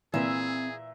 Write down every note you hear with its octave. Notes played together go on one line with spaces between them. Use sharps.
A#2 E3 C4 G#4 E5